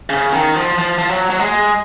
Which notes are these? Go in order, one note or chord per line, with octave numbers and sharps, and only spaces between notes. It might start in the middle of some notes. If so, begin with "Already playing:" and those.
C#3
D#3
F3
F3
F3
F#3
F#3
G#3